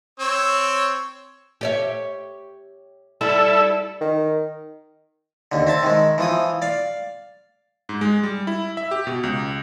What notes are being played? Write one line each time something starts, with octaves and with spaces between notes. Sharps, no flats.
C4 C#5 E6
G4 C#5 E5
G3 E4 A4 E6
D#3
D#2 D3
C4 E5 A5
D#3 G#3
E3 F3 D#6
D5 F5
G#2
G#3
G3
E4
E5
G4
B2
C#2